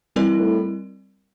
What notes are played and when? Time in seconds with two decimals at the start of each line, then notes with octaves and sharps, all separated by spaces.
0.16 E3 G3 C4 E4 A#4 D5
0.40 A2